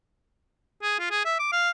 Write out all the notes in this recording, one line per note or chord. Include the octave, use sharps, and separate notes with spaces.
G#4
F4
G#4
E5
D6
F5